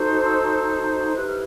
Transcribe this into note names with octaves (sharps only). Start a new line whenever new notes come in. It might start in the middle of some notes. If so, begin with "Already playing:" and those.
Already playing: D#4 F#4 A4 C5
E6
E4 G4 B4 F#6
F6